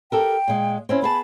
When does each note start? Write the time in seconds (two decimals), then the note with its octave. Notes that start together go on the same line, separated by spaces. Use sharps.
0.12 G4 A4 A#4 G5
0.48 A#2 G#3
0.89 C4 C#4 E4
1.02 B3 G#4 A5 B5